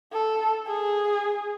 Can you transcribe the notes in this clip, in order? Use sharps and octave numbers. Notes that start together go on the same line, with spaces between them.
A4
G#4